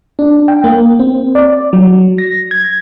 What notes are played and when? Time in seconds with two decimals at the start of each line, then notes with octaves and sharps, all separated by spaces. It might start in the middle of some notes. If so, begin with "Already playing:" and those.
0.19 D4
0.48 G5
0.64 A#3
0.99 C4
1.35 D5
1.73 F#3
2.18 A#6
2.51 G#6